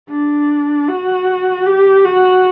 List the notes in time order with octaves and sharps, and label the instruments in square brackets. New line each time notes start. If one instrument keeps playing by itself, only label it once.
[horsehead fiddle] D4
F#4
G4
F#4